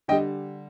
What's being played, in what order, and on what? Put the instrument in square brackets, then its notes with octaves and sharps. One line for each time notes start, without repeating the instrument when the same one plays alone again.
[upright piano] D3 G3 D#5 G5